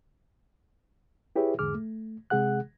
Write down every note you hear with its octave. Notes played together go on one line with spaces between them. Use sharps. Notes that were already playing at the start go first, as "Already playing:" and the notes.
E4 G4 G#4 B4 C#5 E5
E2 G#2 D3 G#4 D6 F6
A3
C3 G#3 G#4 F#5 F#6